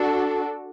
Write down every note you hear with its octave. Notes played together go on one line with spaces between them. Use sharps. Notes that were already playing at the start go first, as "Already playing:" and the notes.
Already playing: D4 F#4 A4